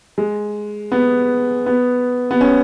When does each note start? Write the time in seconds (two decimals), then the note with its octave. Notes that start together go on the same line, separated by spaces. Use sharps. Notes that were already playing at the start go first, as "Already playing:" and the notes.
0.18 G#3
0.92 B3
1.66 B3
2.31 B3
2.41 C#4